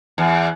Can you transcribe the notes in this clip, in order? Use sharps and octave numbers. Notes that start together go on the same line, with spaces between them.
E2